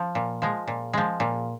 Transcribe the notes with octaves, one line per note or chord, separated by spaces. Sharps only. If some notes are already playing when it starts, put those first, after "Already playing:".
Already playing: F3
A#2
F3 G#3
A#2
F3 G#3
A#2